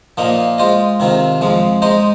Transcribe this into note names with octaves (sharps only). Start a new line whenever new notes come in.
A#2 F3 A#3 D#4
G#3 F4 C5 D#5
C3 D#3 C4 F4
F2 F3 G#3
G#3 D#4 C5 D#5